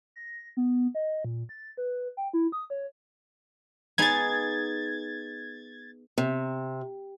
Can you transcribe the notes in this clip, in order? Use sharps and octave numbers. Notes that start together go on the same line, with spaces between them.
A#6
B3
D#5
A#2
A6
B4
G5
E4
D#6
C#5
B3 D#4 G#4 G#6 A6
C3